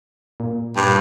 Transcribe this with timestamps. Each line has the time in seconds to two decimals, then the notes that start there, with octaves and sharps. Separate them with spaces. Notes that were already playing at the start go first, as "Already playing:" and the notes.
0.40 A#2
0.76 G2